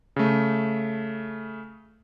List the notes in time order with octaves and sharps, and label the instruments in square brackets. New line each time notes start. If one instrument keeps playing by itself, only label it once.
[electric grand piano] C#3 A3